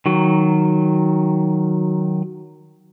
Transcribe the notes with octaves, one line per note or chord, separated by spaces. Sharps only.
D#3 F#3